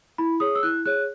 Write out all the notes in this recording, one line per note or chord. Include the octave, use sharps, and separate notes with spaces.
E4 B5
G#4 C#5 D#6
E6
E4 F#6
G#4 C#5 F#6